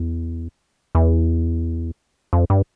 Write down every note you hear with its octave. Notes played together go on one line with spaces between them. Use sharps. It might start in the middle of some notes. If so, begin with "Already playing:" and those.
Already playing: E2
E2
F2
G2